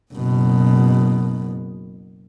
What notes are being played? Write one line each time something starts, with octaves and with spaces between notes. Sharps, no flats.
F#1 B2